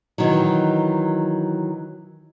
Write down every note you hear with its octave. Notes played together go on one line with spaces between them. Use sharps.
D#3 E3 F#3